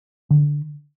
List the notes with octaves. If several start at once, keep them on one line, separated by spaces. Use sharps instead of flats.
D3